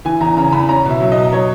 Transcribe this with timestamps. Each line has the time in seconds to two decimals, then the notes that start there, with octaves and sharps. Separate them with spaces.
0.05 E3 G#5
0.20 E2 A#5
0.37 C#3 A#5
0.52 E2 B5
0.69 C#4 A#5
0.85 B2
0.90 E5
1.00 F#3
1.12 D#5
1.17 B2
1.32 F#3 C#5